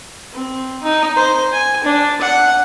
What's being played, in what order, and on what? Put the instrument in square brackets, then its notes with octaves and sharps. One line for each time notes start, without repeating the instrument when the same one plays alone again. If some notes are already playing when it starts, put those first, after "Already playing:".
[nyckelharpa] C4
D#4
C5
G#5
D4
F#5